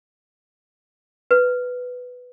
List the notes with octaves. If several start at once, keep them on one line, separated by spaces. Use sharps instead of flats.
B4